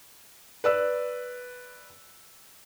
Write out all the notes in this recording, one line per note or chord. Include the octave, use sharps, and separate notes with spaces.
B4 D5 E6